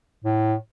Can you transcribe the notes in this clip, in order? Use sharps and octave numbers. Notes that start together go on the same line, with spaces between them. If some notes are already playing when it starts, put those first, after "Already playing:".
A2